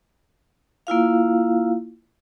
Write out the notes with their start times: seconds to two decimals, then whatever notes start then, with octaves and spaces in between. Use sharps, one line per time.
0.87 A#3 E4 F4 F5